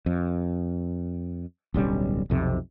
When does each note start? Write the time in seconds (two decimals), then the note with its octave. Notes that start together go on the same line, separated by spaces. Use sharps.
0.06 F2
1.74 D1 B1 G3 C#4
2.30 B1 F2 C3